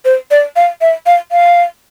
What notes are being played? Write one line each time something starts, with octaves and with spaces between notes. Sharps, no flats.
C5
D5
F5
E5
F5
F5